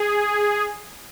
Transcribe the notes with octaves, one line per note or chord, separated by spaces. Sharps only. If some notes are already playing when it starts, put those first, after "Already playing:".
Already playing: G#4